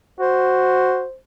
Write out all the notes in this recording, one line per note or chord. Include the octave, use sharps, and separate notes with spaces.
F#4 C5